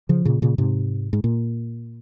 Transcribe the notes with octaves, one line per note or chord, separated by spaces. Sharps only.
C#3 F3
A#2 C#3
A#2 C#3
G#2 C3
G#2
A#2